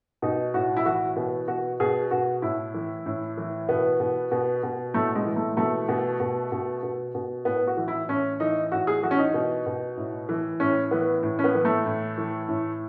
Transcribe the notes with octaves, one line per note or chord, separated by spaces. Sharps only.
B2 D#4
A2 F#4
E4
E3 F#4
B2
B2 F#4
B2 G#4
B2 F#4
A2 E4
E3
A2
E3
B2 B3
B2
B2
B2
A2 A3
G#3
E3
A3
B2 A3
B2
B2
B2
B2
B2
A2 B3
F#4
E3
E4
A2 C#4
E3 D#4
A2 F#4
G#4
E3 F#4
C#4
D#4
B2
B2
A2
E3
A2 C#4
E3 B3
A2
C#4
B3
E3
A3
A2
E3
A2